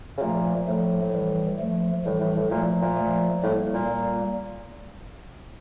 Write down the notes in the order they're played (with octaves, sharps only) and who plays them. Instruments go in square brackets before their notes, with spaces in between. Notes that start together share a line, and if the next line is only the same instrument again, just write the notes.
[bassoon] C#3
[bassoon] A#2 [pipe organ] F3 A3
[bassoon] A2 [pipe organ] F3 A3
[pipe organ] E3 G3
F3 A3
[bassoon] A2 [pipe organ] E3 G3
[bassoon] A2
A2
[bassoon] A#2 [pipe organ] F3 A3
[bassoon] A#2
[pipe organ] F3 A3
[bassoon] A2 [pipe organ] G3 A#3
[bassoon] A#2
[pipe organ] G3 A#3